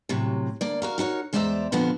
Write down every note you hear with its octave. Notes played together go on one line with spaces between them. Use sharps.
A2 C3 F#3
D2 A#3 D5
F#4 A#4 F5
D#4 F#4 A#4 C#5
E2 G#3 C5 D5 E5 A#5
A#2 D3 F3 B3 C4